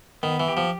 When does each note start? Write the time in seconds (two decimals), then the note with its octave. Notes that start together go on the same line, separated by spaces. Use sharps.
0.23 D#3 B3
0.40 E3
0.48 G4
0.57 F3